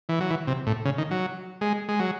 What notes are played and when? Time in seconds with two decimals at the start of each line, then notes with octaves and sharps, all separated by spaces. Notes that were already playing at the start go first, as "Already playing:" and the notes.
0.09 E3
0.20 F#3
0.30 E3
0.47 C3
0.67 A2
0.85 C#3
0.98 D#3
1.11 F#3
1.61 G#3
1.89 G#3
2.00 F#3